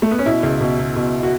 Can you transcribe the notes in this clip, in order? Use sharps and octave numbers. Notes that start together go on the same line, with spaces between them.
A3
B3
C#4
B2 E4
C#2
B2
B2
B2
F#4